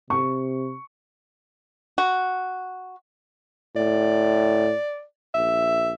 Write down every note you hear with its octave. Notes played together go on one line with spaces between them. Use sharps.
C3 C#6
F#4
A2 D5
A#1 E5